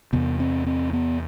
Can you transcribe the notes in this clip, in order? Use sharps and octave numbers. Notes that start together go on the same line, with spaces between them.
E2 C3 B3
C4
C4
B3